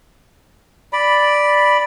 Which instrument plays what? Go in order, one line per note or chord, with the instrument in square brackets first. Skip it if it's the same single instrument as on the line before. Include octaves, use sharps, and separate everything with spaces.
[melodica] D5 B5